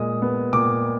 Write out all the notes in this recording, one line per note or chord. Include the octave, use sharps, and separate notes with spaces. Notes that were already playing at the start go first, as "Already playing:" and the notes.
Already playing: A#2 G#3 D#6
B3
A#2 D6